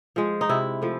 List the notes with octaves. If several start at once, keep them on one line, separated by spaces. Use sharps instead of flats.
F3 G#3
D#4
C3 E4
F3 A3